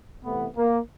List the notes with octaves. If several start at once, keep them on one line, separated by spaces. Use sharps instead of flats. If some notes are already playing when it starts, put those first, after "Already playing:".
C3 E3 A3 B3
A#3